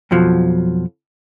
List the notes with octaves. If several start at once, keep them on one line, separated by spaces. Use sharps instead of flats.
F2 B2 F3 F#3